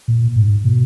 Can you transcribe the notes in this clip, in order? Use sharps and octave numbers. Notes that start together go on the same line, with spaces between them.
A#2
G#2
B2